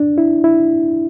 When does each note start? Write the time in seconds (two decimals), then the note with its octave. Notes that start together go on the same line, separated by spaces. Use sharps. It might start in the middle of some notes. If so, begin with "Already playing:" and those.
Already playing: D4
0.18 E4
0.44 E4